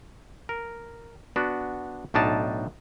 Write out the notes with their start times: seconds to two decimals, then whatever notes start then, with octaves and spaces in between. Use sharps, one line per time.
0.49 A#4
1.36 B3 D4 F#4
2.14 B1 A2 D4 D#4 A5